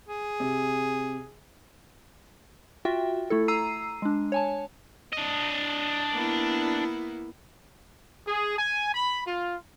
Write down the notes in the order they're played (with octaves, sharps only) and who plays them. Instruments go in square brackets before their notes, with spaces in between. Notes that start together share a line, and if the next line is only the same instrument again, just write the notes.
[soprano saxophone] G#4
[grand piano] C3
[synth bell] F4 F#4 E5 G5
A3 E4 A4
A#5 E6 C7 D#7
G#3 D4
C#5 G#5 A5
[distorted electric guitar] D4 D#5
[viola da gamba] A#3 B3 E4
[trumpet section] G#4
G#5
B5
F4